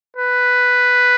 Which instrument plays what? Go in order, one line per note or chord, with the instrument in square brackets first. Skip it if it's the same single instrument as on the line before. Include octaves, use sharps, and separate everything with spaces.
[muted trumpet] B4